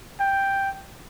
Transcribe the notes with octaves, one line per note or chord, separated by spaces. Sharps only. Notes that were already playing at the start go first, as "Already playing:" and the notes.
G5